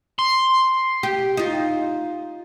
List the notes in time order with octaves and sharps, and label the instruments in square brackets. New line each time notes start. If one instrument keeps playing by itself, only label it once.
[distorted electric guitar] C6
[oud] G4
D#4 F4